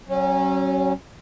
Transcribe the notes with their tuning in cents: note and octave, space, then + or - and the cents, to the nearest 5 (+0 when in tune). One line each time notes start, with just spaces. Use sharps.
F#3 +30 C#4 -20